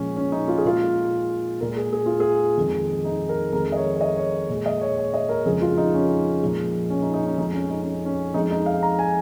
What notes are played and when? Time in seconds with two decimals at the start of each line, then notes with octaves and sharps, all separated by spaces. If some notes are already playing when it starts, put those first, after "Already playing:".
Already playing: A#2 F3 G#3 C#4
0.17 C#4
0.32 D#4
0.48 F4
0.58 G#4
0.65 A#2 G#3 F4
1.61 A#2 G#3 A#4
1.76 G#4
1.93 G#4
2.06 F4
2.20 G#4
2.57 F2 D#3 G#3
3.05 D#4
3.29 A#4
3.53 F2 D#3 G#3 A#4
3.72 D#5
3.77 C#5
3.95 C#5
4.01 D#5
4.17 C#5
4.49 A#2 G#3
4.66 D#5
4.81 C#5
4.97 C#5
5.14 D#5
5.29 A#4
5.45 F2 C#3 F3 G#3 G#4
5.62 F4
5.77 D#4
5.94 C#4
6.41 A#2 F3 G#3
6.90 C#4
7.02 D#4
7.14 D#4
7.26 C#4
7.38 F2 F3 G#3 D#4
7.53 C#4
7.70 D#4
7.82 C#4
8.05 C#4
8.34 F2 F3 G#3 D#4
8.51 D#4
8.66 F5
8.83 A#5
8.99 G#5